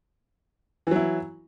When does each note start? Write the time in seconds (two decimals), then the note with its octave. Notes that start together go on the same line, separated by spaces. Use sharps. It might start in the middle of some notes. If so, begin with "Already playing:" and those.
0.87 E3
0.91 F#3
0.96 E4